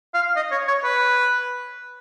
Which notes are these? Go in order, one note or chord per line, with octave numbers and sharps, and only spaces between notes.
F5
D#5
C#5
C#5
B4